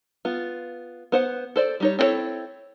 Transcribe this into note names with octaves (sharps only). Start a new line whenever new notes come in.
B3 F4
B3 C5 F#5
A4 C5 D5
G3 D#4 C#5
C4 D4 E4 A4 C#5